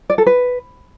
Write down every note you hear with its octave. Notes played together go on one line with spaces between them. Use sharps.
D5
A4
B4